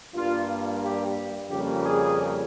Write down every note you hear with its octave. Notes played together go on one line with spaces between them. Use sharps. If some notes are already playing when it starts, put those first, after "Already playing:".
G2 G3 A#3 F4
G4
F2 C#3 G3 A#3 G4
G#4